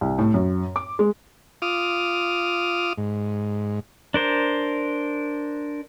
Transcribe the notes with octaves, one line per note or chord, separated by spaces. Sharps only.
C2
A2
F#2
D6
G#3
F4 D6 D#6 F6
G#2
D4 A#4 C5